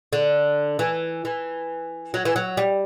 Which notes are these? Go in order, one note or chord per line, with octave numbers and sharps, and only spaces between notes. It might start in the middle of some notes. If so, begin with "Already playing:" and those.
D3
E3
E3
F#3
E3
F#3
G3